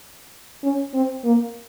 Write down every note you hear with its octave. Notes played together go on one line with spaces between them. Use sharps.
C#4
C4
A#3